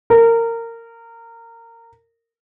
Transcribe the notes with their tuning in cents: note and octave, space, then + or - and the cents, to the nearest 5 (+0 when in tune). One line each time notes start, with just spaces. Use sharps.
A#4 -20